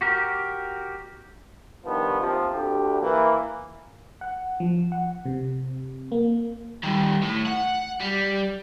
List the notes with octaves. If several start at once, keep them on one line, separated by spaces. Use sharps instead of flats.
F#4 G4 A#4
G2 D#3 F3 B3
D#2 C3 F3
D2 G4
E3 A#3
F#5
F3
F#5
C3
A#3
D#3 G3
A2
F#5
G3